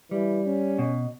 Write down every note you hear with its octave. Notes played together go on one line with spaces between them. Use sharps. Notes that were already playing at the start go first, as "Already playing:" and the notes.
E3 G3
C#4
B2